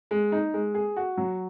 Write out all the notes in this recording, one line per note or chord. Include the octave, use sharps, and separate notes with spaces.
G#3
D#4
G#3
G#4
F#4
F#3